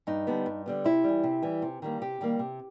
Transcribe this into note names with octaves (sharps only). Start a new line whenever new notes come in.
G2 D#4
D3 G3 B3
G2
D3 G3 B3
C3 E4
E3 G3
C3
E3 G3
C3
D#3 G3 A#3
C3 G4
D#3 G3 A#3
C3